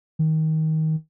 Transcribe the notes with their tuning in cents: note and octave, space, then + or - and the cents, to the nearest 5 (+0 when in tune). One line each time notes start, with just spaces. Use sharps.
D#3 +20